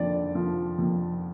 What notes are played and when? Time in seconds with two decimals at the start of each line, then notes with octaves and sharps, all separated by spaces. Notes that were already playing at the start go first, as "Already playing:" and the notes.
Already playing: F2 D3 D5
0.35 F3
0.78 F2